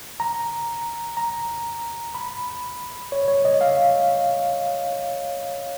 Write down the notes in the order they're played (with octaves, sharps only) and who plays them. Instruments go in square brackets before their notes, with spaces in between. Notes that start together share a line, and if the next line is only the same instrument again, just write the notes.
[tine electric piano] A#5
A#5
B5
C#5
C#5
D#5
F5